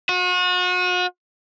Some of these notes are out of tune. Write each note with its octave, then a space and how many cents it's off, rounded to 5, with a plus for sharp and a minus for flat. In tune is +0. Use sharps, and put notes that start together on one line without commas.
F#4 -40